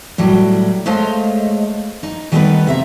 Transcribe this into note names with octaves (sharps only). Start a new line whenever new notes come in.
A2 F#3 G3
G#3 A3 C5 C#5 D#5 F5
D#4
D#3 G3 A3 B3 D#4 B4
C3 E5 A#5